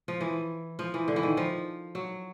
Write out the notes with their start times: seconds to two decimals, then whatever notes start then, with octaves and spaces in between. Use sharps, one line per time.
0.08 F3
0.21 E3
0.79 F3
0.94 E3
1.08 D3
1.16 E3
1.23 D#3
1.37 F3
1.95 F#3